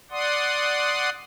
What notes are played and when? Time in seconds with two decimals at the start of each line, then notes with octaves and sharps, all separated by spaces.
0.11 D5 F#5 C6 D#6